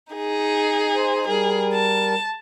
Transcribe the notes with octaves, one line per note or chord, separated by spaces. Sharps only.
D#4 G#4
C5
G3 G#4 A#4
A5